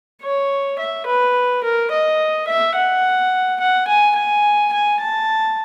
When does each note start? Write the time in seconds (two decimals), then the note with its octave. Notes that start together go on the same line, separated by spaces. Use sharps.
0.22 C#5
0.79 E5
1.07 B4
1.64 A#4
1.92 D#5
2.48 E5
2.76 F#5
3.60 F#5
3.88 G#5
4.16 G#5
4.73 G#5
5.00 A5